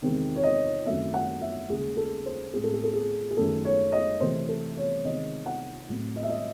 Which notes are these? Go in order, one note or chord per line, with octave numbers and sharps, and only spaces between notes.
E2 C3 D#3 G#3 C4
C#5
D#5
F#2 D#3 F#3 A3 C4 E5
F#5
E5
D#2 C#3 G#3 G#4
A4
C5
A2 G#3 C4 G#4
A4
G#4
A4
G#4
G#4
F#2 D#3 A3 A4
C#5
D#5
C3 E3 A3 C4 C5
A4
C#5
C3 D#3 G#3 D#5
F#5
A2 F#3 C4
D#5
E5
D#5